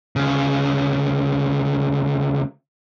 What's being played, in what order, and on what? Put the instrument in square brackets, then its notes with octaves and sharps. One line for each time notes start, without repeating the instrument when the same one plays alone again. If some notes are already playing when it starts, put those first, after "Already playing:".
[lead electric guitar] D2 C#3